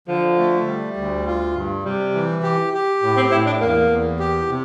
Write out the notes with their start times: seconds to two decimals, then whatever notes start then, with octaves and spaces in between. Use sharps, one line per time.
0.08 D3 F3
0.38 A3
0.67 G3
0.96 D2
1.27 F4
1.56 G2
1.84 C3 G3
2.14 E3
2.43 G4
2.73 G4
3.02 A2
3.17 C4
3.31 A2 E4
3.47 D4
3.61 E2 A#3
3.91 E2
4.19 G4
4.49 C3